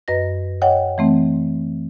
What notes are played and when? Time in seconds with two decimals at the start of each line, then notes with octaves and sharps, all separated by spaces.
0.08 F#2 B4 D#5 A#6
0.62 C#5 D#5 F#5 G5
0.98 E3 A3 C4